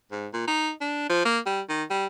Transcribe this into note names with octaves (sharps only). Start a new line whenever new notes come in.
G#2
A#2
D#4
D4
F3
A#3
G3
D#3
G3